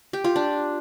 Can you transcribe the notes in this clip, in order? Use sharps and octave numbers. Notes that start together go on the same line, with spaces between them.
G4
F4
D4